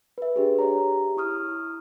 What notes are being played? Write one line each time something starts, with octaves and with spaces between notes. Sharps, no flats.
B4 E5
D4 G4 G#4
G4 C#5 A#5
E4 C#6 D#6 F6